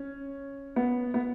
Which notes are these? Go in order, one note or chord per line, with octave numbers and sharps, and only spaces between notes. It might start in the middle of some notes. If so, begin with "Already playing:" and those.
Already playing: C#4
B3
B3